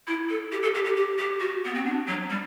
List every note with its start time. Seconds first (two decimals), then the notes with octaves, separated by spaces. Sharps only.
0.07 E4
0.29 A4
0.52 G4
0.62 A4
0.74 G4
0.85 G4
0.96 G4
1.18 G4
1.40 F#4
1.65 B3
1.74 C4
1.85 D4
2.07 F#3
2.30 G3